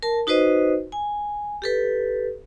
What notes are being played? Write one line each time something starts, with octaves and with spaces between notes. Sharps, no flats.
A#4 A5
D#4 F#4 B4 C5 D#5
G#5
G4 A4 B4